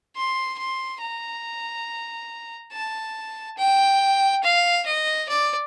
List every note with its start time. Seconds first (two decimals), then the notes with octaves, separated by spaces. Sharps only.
0.16 C6
0.58 C6
1.01 A#5
2.72 A5
3.57 G5
4.44 F5
4.86 D#5
5.29 D5